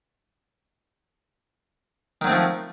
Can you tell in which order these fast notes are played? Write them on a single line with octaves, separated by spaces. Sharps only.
D#3 F#3 C4 A3 F3